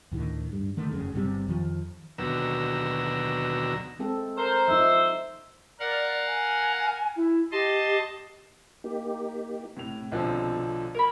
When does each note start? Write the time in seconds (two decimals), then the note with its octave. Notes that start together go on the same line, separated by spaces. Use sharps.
0.11 D2 A2 D3 D#3
0.52 G2
0.77 D3 D#3 A3
0.91 F1 A#1 F#2 C#3
1.14 G1 C3 G3 C4
1.48 F2 D#3 F3
2.18 D#2 B2 D3 F#3 A#5 E6
3.99 G#3 C4 A4
4.38 A#4 C5
4.68 F3 D#4 E5
5.79 A#4 D5 F5 F#5
6.27 G#5
7.16 E4
7.52 G4 D#5 A5 C6
8.84 A#3 D#4 G4
9.77 A2 C3 F7
10.12 B1 D3 F3
10.94 A#4 B5 G#6